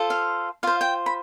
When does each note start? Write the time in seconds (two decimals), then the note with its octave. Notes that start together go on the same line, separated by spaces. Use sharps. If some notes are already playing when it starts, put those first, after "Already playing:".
Already playing: F4 A4 C5
0.10 F5
0.63 F4 C5 F5
0.81 G5
1.06 B5